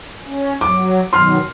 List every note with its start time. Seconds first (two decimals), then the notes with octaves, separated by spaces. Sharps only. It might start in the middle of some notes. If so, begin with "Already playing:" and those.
0.24 C#4
0.61 F#3 D6
1.13 B2 D#3 F#3 C6 F6